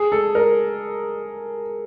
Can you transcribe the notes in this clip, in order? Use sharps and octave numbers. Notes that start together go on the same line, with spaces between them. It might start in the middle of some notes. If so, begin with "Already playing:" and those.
Already playing: G#4
A4
A#4